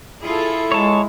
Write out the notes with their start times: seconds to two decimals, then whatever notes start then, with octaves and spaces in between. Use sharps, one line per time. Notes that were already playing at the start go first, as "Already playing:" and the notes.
0.24 E4 F4 G#4 A4
0.72 G#3 C#5 A5